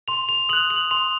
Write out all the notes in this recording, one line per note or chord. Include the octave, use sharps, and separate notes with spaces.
C6 F7
F7
D#6 F#6 F#7
F#7
C6 F7